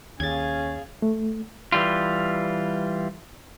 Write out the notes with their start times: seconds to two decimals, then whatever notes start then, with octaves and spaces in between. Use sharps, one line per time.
0.20 D#2 C#4 G#4 F5 G#6 A6
1.02 A3
1.72 E3 G3 F4